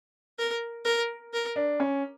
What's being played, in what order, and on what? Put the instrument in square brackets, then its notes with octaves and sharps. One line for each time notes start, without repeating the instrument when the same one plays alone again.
[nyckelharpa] A#4
A#4
A#4
[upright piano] D4
C#4